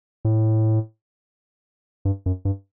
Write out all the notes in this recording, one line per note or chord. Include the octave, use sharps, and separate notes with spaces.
A2
G2
F#2
G2